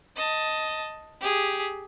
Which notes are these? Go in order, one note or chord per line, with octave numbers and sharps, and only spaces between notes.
D#5 A5
G4 G#4